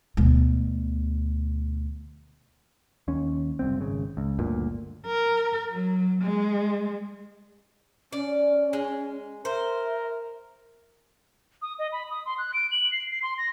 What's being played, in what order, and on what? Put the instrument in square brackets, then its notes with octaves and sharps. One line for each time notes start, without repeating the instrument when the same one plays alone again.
[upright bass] D2 B2
[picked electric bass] D#2 C#4
F#1 C2 C4
G#1 C#3
C#2
G1 D2 A#2
[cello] A#4
F#3
G#3
[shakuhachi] C#4 [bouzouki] D5
[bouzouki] G#3
[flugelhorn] A#4 [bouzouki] C5 [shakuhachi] E5
[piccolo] D#6
D#5
B5
D#6
C6
F#6
D7
F#7
C7
C7
C6
A#6